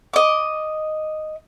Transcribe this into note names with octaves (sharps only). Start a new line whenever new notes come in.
D#5 D6